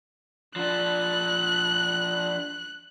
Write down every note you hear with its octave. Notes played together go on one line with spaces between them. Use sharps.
F3 D4 F#6